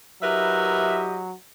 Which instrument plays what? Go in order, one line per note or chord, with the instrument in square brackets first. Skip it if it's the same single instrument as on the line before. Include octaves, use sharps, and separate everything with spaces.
[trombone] F#3 [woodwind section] E4 G4 D#5 [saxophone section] A#4 B4 E5